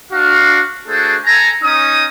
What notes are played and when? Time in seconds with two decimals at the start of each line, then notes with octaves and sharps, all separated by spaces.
0.12 D4 F#4 F5
0.88 A3 D4 F#4 G#4 A4 C5
1.25 A4 G#5 A#5
1.63 C#4 D#4 D#6